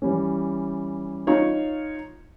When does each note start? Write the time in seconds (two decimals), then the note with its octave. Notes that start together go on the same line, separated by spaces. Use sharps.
0.02 E3 G3 C#4
1.27 D#4 F4 C#5